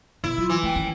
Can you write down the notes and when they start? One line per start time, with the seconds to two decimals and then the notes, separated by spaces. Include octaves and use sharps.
0.24 B2 E4
0.38 F#3 F4
0.49 E3
0.63 A3 G5
0.75 D#3 C#4